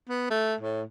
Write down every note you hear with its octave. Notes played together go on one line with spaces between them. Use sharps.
B3
A3
A2